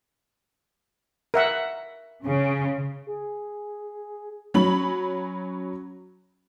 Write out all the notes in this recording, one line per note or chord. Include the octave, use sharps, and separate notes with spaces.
A#4 E5 F#5
C#3
G#4
F#3 C#4 B5 F#7